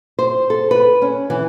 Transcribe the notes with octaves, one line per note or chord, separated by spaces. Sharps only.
C5
A4
B4
C#4
E3